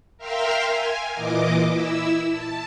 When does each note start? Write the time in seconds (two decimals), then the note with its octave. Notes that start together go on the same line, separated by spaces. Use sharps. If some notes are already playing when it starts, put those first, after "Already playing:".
0.18 A#4 E5 F5 G5 C6 F6
0.67 G#5
1.14 A#2 E3 D#5 D6
1.70 E4 E6
2.30 A5